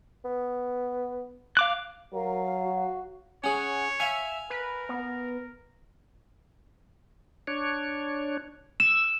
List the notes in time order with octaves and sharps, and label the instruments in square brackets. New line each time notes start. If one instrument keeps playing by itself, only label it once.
[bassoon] B3
[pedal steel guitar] F5 D6 F#6
[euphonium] F#3 [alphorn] A#4 [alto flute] F5
[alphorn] F#4
[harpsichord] C#4 G#4 [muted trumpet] C#5 [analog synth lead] F#5
[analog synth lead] E5 [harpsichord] F5 G#5
[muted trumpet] A#4 [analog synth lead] B4
[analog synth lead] B3
[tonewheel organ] D4 C#5
[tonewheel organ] E6 [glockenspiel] E7